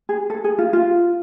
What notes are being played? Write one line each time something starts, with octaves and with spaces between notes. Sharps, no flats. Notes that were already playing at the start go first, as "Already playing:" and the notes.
G#4
A4
G#4
F4
F4